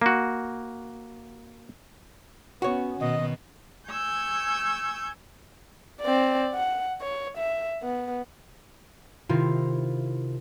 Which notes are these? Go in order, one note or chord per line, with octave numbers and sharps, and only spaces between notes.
A#3 F#4
B3 C#4 F#4 C#5
B2 D#3 D#5
G#5 C#6 E6 G6 G#6
C4 D5
F#5
C#5
E5
B3
C3 D#3 E4 F4